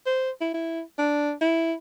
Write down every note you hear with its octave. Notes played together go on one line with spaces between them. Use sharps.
C5
E4
E4
D4
E4